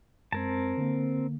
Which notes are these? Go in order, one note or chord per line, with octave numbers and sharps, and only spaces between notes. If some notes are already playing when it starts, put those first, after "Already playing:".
F#2 G#3 C4 A#4 A5 G#6
D3 A#3